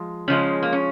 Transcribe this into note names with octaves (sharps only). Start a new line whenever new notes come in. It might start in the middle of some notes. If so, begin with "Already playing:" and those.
Already playing: F3 G#3
C#3 F3 G#3 C#4
A#3
C#4